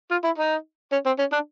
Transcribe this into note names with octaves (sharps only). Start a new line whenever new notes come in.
F4
E4
D#4
C#4
C4
C#4
D4